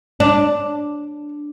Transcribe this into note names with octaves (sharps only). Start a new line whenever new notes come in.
D4